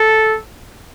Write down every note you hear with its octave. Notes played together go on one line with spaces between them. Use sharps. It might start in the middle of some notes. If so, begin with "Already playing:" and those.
Already playing: A4